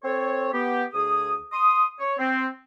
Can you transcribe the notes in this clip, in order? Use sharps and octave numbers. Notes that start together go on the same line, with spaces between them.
C4 A4 C#5
B3 G4
D2 G#4 D#6
C6 D#6
C#5
C4